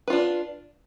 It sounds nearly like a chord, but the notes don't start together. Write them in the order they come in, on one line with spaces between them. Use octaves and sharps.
B4 F4 D4